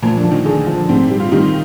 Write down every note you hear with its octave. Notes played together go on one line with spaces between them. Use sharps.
A#2 F3 A#3
D3 D4
F3
D#3 D#4
D3 D4 G#4
F3
G#2 C3 C4
G3
F4
D#3 G3 D#4